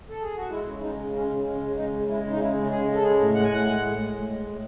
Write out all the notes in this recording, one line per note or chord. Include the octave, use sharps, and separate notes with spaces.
A4
G#4
F#4
G#3 E4
C#3
G#3 D#4
C#3
G#3 C#4
C#3
G#3 C#4
C#3
G#3 D#4
C#3
G#3 E4
C#3
D#4
G#3 E4
C#3
G#3 G#4
C#3
A4
G#3 G#4
A2
G#3 F#5
G#5
A2 F#5
G#3
A2
G#3
A2
G#3
A2